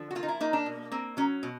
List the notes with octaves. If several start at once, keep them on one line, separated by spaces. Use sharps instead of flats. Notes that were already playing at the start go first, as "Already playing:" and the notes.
Already playing: D3 F3
F#4
A#3 F4
D#4
E4
A#3 D#4
D4
B2
A#3 C4
F#3 C#4
B2